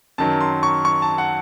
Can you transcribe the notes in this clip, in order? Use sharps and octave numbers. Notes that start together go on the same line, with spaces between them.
F#2 D#3 F#3 A5
C6
C#6
C#6
A5
F#5